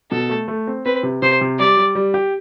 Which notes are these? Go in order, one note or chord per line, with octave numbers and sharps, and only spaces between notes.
B2 A4
A3
A3
C4
C4 B4
C3
C3 C5
C3
G3 D5
G3
G3
G4